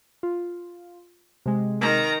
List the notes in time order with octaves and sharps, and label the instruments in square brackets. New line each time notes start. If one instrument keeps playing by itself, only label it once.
[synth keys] F4
C3 G#3
[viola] D#3 A#5